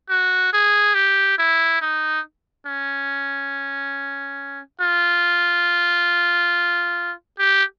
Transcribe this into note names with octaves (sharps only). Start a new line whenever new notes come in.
F#4
G#4
G4
E4
D#4
C#4
F4
G4